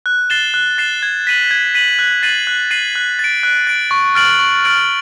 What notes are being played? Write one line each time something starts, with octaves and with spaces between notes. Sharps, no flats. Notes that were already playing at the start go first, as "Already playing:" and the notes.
F#6
A6 C7 E7 G7
F#6
A6 C7 E7 G7
G#6
B6 D#7 F#7
G#6
B6 D#7 F#7
F#6
A6 C7 D#7 F#7
F#6
A6 C7 D#7 F#7
F#6
A6 D7
F#6
A6 D7
C#6
F6 A6 D7 F#7
C#6
F6 A6 D7 F#7